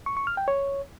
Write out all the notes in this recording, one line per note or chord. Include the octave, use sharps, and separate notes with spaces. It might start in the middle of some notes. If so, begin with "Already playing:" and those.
C#6
C#6
F6
G5
C#5